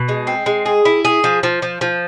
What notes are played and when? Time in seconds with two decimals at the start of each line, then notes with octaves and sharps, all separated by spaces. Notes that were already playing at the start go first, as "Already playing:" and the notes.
Already playing: B2
0.09 G#3
0.27 C4
0.46 G#3
0.66 G#4
0.85 E4
1.05 G#4
1.24 F3
1.43 F3
1.62 F3
1.81 F3